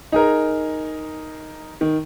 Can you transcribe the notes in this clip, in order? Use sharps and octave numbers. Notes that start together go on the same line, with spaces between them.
D#4 G#4 A#4
D#3